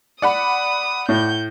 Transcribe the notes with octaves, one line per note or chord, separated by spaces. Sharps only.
D5 F#5 B5 D#6
A2 G6